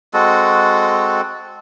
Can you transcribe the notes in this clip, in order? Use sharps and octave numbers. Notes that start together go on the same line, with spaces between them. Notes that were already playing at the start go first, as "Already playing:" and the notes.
G#3 C4 F#4 A4